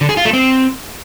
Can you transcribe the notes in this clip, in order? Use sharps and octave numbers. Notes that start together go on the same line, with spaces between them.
D3
G#4
F4
A3
C4